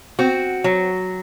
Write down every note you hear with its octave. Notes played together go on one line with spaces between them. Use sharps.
C4 F#4
F#3